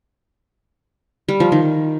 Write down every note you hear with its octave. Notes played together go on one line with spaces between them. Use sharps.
G3
F3
D#3